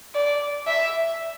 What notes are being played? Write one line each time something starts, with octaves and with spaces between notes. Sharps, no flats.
D5
E5